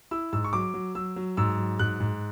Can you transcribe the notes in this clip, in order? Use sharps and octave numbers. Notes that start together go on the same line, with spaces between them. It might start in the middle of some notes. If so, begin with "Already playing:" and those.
E4 E6
G#2 E6
C#6
F#3 D6
F#3
F#3 E6
F#3
G#2 E6
F#3
G#2 F#6
G#2